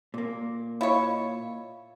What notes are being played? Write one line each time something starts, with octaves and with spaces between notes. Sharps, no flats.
A#2 A#3
E4 F4 C#5 D#5 F5